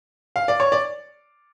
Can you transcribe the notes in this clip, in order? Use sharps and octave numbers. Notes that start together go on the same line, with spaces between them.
F5
D5
C#5
D5